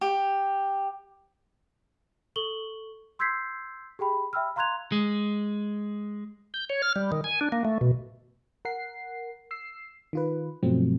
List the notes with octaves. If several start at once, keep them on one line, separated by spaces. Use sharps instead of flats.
G4
A4 C#6 F#7 G7
C6 E6 G6 G#6 B6 C7
G4 G#4 G5 B5
E5 G5 B5 E6 F6
F5 A#5 C6 F#6 G#6 F7
G#3
G6
C#5
F6
G3
D#3
G#5
D4
A#3
A3
B2
A#4 F#5 C7
E6 C7
D#3 F4 B4
G2 B2 F3 F#3 A3 C4